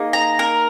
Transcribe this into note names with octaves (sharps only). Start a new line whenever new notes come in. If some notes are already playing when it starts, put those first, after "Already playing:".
Already playing: A#3 D#4 G#4
A#5
A#4